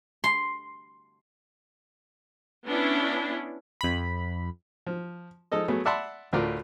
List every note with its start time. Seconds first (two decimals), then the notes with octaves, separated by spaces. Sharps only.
0.24 C6
2.67 B3 C#4 D4 E4
3.81 F2 B5
4.87 F3
5.52 F3 G#3 D#4 A4 D#5
5.68 F#3 A3 B3 G#4
5.85 D5 E5 F#5 A5 B5 C6
6.33 D2 A2 A3 F4 A#4 D5